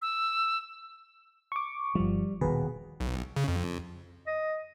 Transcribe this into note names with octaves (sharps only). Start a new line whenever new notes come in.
E6
C#6 D6
G1 F3 G3
D#1 B2 D#3 G#4 B4
B1
C#3
F2
D#5